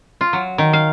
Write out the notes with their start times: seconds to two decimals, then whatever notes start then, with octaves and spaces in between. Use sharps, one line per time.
0.21 F4
0.33 F#3
0.58 D#3
0.73 F5